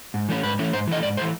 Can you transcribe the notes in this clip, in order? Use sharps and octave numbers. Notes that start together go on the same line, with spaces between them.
G#2
E3 A3 C#4
G#2 B4
E3 A3 C#4
G#2 C5
E3 A3 D#5
G#2 D5
E3 A3 C5